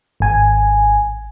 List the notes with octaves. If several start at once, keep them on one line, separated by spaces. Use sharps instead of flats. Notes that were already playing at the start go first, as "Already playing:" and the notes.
G#1 G#5